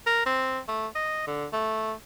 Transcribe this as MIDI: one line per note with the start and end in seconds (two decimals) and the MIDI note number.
0.06 0.23 70
0.26 0.59 60
0.68 0.87 57
0.95 1.23 75
1.27 1.46 50
1.53 1.93 57